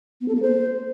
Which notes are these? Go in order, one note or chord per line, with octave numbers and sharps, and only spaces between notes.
B3
A4
A#3
C5